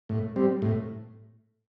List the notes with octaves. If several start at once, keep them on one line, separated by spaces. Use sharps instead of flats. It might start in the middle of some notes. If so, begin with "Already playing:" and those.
A2
G3 C4
A2